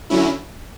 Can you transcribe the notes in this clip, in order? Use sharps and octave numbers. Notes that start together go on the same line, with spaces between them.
D3 F#3 C#4 E4